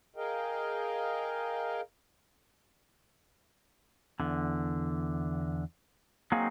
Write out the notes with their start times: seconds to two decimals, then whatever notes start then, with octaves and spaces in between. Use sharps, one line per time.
0.16 G#4 A#4 D#5 F5 G5
4.20 E2 D3
6.32 F#3 A#3 C4 D#4 G#4 F5